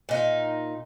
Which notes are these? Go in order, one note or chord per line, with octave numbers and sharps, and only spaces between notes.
A#2 D#4